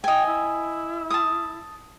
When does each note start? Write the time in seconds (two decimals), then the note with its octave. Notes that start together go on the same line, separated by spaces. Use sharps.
0.04 D#5 G5 G#5
0.26 E4
1.10 A5 D#6